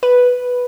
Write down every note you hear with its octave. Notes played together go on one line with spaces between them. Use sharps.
B4